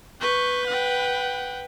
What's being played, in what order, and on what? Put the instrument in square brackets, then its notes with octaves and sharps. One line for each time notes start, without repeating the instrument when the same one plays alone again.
[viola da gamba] B4 [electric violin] C#6 G6
[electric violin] F#5 G5